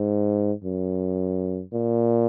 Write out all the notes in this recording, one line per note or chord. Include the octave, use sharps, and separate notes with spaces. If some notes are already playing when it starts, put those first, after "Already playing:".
Already playing: G#2
F#2
A#2